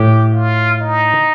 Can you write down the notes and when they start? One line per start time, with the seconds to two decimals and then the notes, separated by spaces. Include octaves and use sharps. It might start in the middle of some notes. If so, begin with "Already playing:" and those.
Already playing: A2 G4
0.33 F4
0.80 D#4